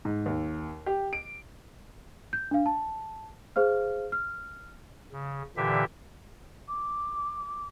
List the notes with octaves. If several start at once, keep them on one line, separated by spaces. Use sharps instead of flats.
G#2
D#2
G4
D7
G6
D4 F5
A5
G#4 C5 F5 F6
F6
C#3
A#2 D3 E3 G4 E5
D6